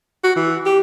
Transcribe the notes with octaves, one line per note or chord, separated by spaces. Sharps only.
F#4
E3
G4